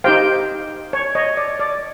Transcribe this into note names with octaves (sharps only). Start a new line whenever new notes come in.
D#4 G4 C5 F5 G5
C#5
C#5 D#5
D5
D5